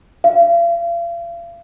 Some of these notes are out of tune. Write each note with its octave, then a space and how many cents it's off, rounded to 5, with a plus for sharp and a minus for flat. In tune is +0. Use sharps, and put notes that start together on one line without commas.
F5 -40